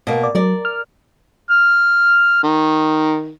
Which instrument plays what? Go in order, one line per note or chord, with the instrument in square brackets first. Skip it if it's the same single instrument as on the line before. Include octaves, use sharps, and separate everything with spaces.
[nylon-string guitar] B2 A#3
[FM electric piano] D5
[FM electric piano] F#3 [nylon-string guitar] A#4 D5
[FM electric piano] F6
[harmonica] F6
D#3